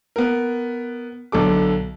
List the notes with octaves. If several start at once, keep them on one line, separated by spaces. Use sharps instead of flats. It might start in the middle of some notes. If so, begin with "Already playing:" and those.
B3 A#4
B1 D3 A4 D6